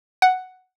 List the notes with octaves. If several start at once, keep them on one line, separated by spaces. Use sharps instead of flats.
F#5